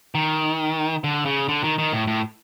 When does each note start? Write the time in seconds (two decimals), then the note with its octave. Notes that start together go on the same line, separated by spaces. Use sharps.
0.15 D#3
1.04 D3
1.25 C#3
1.48 D3
1.64 D#3
1.78 D#3
1.93 A2
2.07 A2